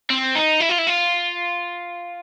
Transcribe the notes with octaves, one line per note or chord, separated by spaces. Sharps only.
C4
D#4
E4
F4
E4
F4